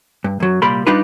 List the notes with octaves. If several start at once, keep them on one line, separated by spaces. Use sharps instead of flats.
G2
F#2 F#3
C2 A#2 G3 A#4 B5 C6
G3 D4 D#4 F4 G4 B4